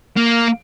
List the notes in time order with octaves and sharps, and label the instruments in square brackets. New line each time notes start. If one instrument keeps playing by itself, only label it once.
[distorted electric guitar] A#3